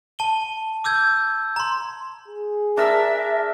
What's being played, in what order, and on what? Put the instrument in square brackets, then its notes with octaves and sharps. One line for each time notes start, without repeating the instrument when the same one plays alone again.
[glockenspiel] A5 D#7 G7
D6 E6 G6 G#6
A#5 C6
[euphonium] G#4
[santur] D4 A#4 E6 [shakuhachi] E5